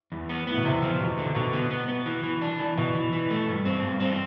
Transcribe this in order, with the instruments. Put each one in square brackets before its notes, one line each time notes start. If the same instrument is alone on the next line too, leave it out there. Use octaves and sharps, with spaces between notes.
[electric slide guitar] E2
B3
[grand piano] A2 [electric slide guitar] B3
[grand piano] B2
[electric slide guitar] E2 [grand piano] C3
[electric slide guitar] F3
[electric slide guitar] E2 [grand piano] B2
[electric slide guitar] D3
[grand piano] B2 [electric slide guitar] D3
[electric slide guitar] B3
B3
B3
E3
E3
D4
E3
[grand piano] B2 [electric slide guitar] E3
[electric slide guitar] E3
E3
A3
G2
C4
G2
C4